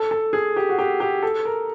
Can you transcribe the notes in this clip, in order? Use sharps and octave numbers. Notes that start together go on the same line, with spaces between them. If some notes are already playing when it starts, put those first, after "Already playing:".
Already playing: A4
A4
G#4
G4
F#4
G4
G4
A4
A#4